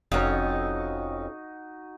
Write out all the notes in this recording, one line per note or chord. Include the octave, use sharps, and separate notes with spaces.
F1 F2 C#4 D#4 F#4 D#5